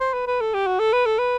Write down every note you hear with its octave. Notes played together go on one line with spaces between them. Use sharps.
C5
B4
B4
A4
G4
F#4
A4
B4
A4
B4